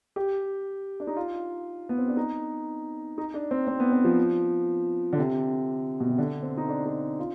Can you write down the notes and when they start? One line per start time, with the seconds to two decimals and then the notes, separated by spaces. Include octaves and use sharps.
0.16 G4
1.00 D4
1.07 D#4
1.16 F4
1.89 B3
1.98 C4
2.08 D4
2.17 D#4
3.18 D#4
3.34 D4
3.51 C4
3.67 C4
3.80 B3
3.92 C4
4.04 F3
5.13 D3
5.18 C3
6.00 B2
6.09 C3
6.18 D3
6.43 C4
6.57 D#4
6.69 D4
6.85 D#4
7.19 F4